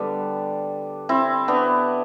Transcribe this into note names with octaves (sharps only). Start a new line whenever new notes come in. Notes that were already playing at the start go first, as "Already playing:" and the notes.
Already playing: D3 G3 B3 D4
C4 E4
B3 D4